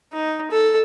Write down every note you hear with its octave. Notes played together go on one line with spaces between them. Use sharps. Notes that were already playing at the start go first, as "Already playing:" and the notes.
D#4
A4